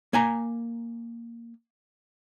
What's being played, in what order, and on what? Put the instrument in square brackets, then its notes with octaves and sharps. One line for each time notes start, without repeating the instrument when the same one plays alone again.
[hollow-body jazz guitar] A#3 G#5 A#5